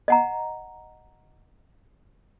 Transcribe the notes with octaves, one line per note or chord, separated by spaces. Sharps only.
D#5 F#5 A#5